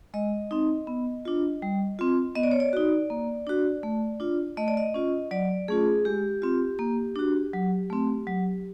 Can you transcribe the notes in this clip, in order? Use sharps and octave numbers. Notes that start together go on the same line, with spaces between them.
G#3 D#5
C4 D#4
B3
D4 F4
G3
C4 F4
B3 D#5
D5
C#5
D5
D#4 F#4
A#3
D4 F#4
A3
D4 F4
A3 D#5
D5
D#5
C#4 F4
F#3 D5
A3 C#4 F4 G#4
G#3 G4
C4 F4
A#3
D4 F#4
F#3
A3 C4
F#3